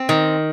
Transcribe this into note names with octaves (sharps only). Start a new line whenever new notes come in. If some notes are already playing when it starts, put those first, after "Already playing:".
Already playing: C4
D#3